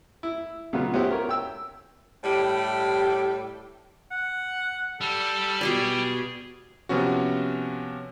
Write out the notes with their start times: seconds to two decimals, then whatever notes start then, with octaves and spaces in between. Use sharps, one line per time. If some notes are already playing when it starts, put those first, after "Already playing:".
0.23 E4
0.73 A#2 C#3 F#3 B3 F4
0.94 B3 C#4 E4 F#4 G4 C5
1.11 A#4 C#5
1.29 G5 E6
2.23 A2 G3 G4
4.11 F#5
5.01 G3 A4
5.61 B2 G4 G#4 D5
6.89 C3 F3 B3 C#4 F#4